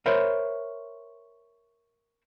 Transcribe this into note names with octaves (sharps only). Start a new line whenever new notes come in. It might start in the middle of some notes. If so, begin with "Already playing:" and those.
A#4 C5 C#5 E5 B5